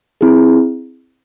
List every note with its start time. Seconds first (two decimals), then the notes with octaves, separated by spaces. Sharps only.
0.21 C4 E4 G#4